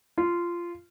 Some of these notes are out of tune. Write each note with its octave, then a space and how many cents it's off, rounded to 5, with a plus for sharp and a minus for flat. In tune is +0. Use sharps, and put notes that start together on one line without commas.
F4 -15